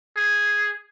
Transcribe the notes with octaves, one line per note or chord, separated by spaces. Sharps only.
G#4